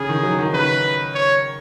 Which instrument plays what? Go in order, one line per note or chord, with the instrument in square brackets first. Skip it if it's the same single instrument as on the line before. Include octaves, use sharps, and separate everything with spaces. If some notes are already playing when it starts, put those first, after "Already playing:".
Already playing: [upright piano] C#3 [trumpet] G#4
[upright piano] D#3
F#3
D#3
[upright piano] C#3 [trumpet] B4
[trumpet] C#5